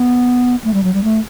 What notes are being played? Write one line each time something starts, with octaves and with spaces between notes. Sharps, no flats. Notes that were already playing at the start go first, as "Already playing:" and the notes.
Already playing: B3
A3
G3
F#3
G3
A3